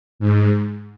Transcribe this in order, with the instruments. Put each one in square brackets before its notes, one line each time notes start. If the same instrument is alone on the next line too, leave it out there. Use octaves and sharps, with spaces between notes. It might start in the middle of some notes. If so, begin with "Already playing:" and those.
[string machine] G#2